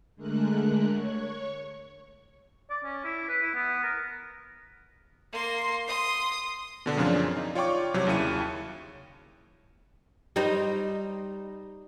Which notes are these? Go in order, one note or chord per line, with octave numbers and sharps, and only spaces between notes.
D3 G#3 A3 A#4 F#6
C#5 C#6
D5
C#4
E4
B4
E4
B3
A#4
A#3 C6
C6 D#6
B2 D3 D4
F#2 A#2 C#3 F3 C4 D4
D#4
F4 C#5 D5 G5 C#6 D6
C2 C3 F#3 C#5
D#2 C#3 E4 C#7 D#7
G3 D#4 C5